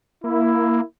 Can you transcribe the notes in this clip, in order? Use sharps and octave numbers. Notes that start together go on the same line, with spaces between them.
A#3 E4